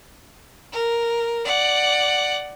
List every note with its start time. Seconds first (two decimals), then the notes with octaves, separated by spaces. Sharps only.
0.72 A#4
1.45 D5 F#5